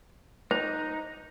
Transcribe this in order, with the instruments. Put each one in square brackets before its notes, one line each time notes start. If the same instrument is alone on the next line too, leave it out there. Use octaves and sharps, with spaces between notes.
[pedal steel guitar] D#4 [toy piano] C5